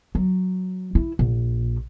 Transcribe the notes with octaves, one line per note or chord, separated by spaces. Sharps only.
F#3
E4
A#1